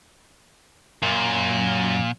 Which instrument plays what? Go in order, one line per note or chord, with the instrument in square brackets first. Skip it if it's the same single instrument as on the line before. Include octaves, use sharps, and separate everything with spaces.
[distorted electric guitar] F#2 [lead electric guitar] A#2